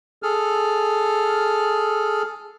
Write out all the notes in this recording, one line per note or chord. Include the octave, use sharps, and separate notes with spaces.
G#4 A4 F6